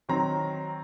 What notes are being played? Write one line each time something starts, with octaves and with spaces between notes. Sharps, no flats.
D#3 F#3 C4 A#5